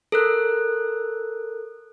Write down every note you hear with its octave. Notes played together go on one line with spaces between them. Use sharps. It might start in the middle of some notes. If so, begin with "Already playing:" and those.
A4 A#4 F#6